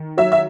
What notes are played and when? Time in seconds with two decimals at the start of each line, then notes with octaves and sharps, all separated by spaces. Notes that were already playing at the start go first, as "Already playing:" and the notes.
Already playing: D#3
0.17 F#3 E5
0.32 E5